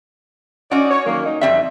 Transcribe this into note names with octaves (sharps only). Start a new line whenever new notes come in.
C#4 D#4 F#4 D5
C#5
D#3 F#3 A#3
D#4
F2 G3 C4 E5